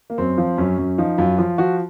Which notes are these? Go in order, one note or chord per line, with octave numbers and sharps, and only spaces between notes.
A#3
F#2 C4
F3
F#2 C#4
F#2
F3 D#4
F#2 F4
F3 F4
F3 F#4